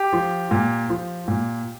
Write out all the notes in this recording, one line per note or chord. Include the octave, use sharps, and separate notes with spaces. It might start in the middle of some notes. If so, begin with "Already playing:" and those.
Already playing: G4
F3
A#2
F3
A#2